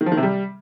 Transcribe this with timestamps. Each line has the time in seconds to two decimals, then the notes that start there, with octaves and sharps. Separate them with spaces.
0.01 D#3
0.06 F3
0.12 D#3
0.17 C3
0.23 G3